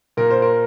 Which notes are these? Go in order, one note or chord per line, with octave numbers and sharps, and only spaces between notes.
A#2 A#4
C5
A#4